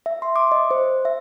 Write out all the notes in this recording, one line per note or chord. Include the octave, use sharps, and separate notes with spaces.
E5
C6
D6
D#5
C5
E5